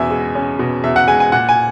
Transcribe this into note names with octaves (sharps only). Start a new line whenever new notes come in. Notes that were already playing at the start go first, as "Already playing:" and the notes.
Already playing: E2 B2 C#4 E5 G#5
G#3
C#4
B2
E2 E5
F#5
G#3 G#5
G#5
A#2 F#5
G#5